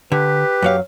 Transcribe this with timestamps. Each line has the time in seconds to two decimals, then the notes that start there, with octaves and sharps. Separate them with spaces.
0.12 D3 G4 B4
0.62 F#2 F#3 F5